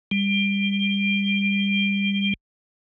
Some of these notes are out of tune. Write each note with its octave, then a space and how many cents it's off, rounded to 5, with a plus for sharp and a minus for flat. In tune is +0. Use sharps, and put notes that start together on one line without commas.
G3 +25